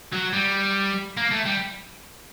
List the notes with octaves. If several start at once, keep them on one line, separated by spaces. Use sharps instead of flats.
F#3
G3
A#3
A3
G3